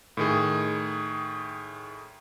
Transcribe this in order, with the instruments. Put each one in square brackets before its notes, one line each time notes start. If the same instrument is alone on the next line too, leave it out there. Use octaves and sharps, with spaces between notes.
[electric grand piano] A2 D#3 G#4